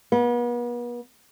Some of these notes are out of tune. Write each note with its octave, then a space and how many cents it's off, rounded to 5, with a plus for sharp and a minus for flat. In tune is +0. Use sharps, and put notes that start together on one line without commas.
B3 -40